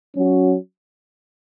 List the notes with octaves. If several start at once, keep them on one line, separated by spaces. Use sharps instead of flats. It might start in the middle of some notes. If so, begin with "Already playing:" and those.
F#3 C#4 F#4